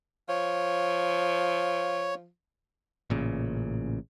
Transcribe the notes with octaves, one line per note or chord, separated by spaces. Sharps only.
F3 C#5
A1 A#2 C#3